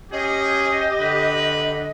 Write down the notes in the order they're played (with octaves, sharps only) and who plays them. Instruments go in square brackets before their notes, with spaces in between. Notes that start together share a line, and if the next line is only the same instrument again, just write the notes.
[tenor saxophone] C#4 [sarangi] G4 [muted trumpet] G#4 [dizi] D#5
[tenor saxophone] D3 [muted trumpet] B4